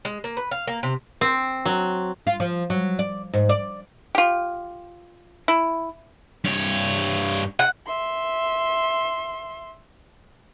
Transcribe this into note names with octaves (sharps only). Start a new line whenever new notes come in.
G#3
A#3
B4
F5
A#3
C3
C4
F#3
F4
F3
F#3
D5
G#2
D5
F4 G4
E4
G2 C#5
F#5
E5 C6